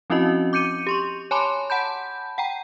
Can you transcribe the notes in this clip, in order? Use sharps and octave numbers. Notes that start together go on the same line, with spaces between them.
F3 C4 C#4 E4 F#4 D#5
D6 G6 C#7 D#7
G4 C6 C#6
C#5 G#5 A5 B5 C6 D6
F#5 A5 B5 G6
F#5 G5 A#5